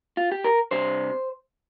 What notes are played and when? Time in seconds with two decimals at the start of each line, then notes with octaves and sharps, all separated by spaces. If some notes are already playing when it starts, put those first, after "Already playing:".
0.17 F4
0.32 G4
0.44 A#4
0.71 C3 G3 D4 C5